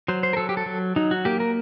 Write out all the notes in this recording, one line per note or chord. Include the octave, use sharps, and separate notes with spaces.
F#3 C5
C5
A#4
F#3 A4
G4
A4
F#3
F#3 D#4
F#4
A#3 G4
A#4